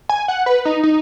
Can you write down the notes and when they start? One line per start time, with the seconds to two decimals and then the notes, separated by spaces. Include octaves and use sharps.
0.09 G#5
0.28 F#5
0.46 B4
0.65 D#4
0.83 D#4